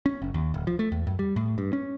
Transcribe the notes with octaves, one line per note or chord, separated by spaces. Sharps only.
C#4
F#1
D#2
D1
F3
A3
E2
F#2
G3
A2
G2
C#4